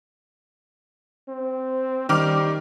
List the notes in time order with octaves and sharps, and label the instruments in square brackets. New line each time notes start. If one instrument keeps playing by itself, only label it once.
[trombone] C4
[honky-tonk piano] D#3 D6 F6 [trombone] G3